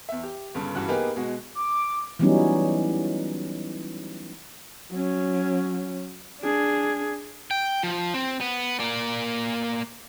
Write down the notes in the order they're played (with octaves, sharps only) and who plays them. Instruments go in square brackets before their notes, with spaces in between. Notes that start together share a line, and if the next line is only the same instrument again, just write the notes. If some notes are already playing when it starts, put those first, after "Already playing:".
[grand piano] E2 E5
G4
G1 G2 C#3
G2 C#3 E3 F#4 F#6
A#3 B3 D#4 G4 G#4 B4
B2 G#3 F#4
[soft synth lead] D6
[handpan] E3 F#3 G3 B3 C#4 D#4
[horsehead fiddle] F#3 C#4
D4 G#4
[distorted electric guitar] G5
F3
C4
B3
A#3 D5